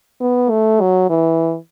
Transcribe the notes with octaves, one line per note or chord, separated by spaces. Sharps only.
B3
A3
F#3
E3